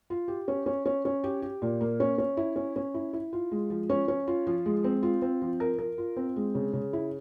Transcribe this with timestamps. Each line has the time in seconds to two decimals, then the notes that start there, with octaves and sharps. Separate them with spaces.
0.10 F4
0.28 G4
0.48 C#4
0.66 C#4
0.85 C#4
1.05 C#4
1.24 G4
1.42 G4
1.62 A#2
1.81 A#3
2.00 C#4
2.18 C#4
2.37 E4
2.56 C#4
2.76 C#4
2.94 E4
3.13 E4
3.33 F4
3.51 G#3
3.70 F3
3.90 C#4
4.08 C#4
4.27 F4
4.47 F3
4.66 G#3
4.84 C4
5.03 F4
5.22 C4
5.42 F3
5.60 A#4
5.78 A#4
5.98 F4
6.17 C4
6.36 G#3
6.55 C#3
6.73 C#3
6.93 E4